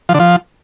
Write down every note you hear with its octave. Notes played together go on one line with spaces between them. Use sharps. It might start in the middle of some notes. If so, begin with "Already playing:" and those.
F3
D3
F3